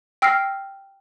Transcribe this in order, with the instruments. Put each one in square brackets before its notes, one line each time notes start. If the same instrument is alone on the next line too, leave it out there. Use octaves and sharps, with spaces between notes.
[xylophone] G5 E6 F6 A#6 C7